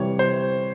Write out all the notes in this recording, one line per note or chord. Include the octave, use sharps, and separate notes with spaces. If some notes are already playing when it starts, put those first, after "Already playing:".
Already playing: C3 E3 G3 C#5
C5